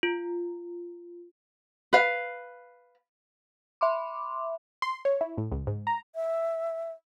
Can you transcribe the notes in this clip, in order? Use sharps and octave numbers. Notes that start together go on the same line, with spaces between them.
F4
B4 F5
E5 B5 C6 D6
C6
C#5
E4
A2
C#2
G#2
A#5
E5